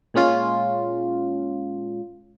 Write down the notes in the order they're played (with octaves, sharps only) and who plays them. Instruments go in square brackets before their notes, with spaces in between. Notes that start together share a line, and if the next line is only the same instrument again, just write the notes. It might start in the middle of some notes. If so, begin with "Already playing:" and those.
[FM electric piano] A#2 G#3 C#4 F4